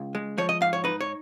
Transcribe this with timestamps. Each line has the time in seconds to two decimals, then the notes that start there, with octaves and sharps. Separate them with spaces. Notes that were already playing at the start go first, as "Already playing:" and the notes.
Already playing: C#2
0.15 G#3
0.38 F3 C#5
0.49 D#5
0.61 G#2 F5
0.73 C#5
0.84 D#4 B4
1.01 C#5